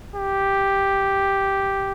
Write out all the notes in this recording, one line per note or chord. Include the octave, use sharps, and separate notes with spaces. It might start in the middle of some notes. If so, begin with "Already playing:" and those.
G4